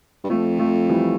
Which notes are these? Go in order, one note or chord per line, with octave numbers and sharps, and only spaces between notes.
G2
F2 F3 A3
F3 A3
E3 G3